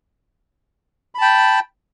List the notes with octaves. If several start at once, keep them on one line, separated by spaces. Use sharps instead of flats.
G5 A5 B5